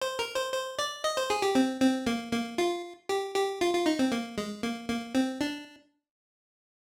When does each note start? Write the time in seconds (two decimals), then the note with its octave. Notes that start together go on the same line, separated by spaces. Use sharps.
0.02 C5
0.19 A#4
0.36 C5
0.52 C5
0.79 D5
1.04 D#5
1.17 C5
1.30 G#4
1.42 G4
1.55 C4
1.81 C4
2.07 A#3
2.32 A#3
2.58 F4
3.09 G4
3.35 G4
3.61 F4
3.74 F4
3.86 D#4
3.99 C4
4.12 A#3
4.38 G#3
4.63 A#3
4.89 A#3
5.15 C4
5.41 D4